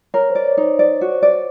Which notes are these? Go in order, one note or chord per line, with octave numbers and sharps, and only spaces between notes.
A#4 C#5
C5
D5
C#5
D#4
C5
C5 D5
F#4
C5
D5